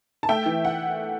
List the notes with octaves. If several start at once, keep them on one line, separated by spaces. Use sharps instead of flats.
A5
A3 E5 G5
E3
F#5